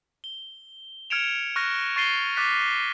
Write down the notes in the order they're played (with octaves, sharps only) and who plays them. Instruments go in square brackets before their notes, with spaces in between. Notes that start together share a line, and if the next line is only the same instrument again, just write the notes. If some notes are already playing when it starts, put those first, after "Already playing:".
[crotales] G7
F6 G#6 C#7 D7 E7 F7
C#6 F6 F#6 A#6
C#6 A6 C7 D#7 G7
C#6 D6 F#6 A6 B6